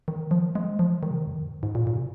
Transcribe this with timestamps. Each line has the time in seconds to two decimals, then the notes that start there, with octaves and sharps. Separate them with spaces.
0.08 D#3
0.31 F3
0.55 G#3
0.79 F3
1.03 D#3
1.10 C3
1.18 D#3
1.27 F2
1.42 A#2
1.51 G#2
1.63 G#2
1.75 A#2
1.87 A#2
1.96 C3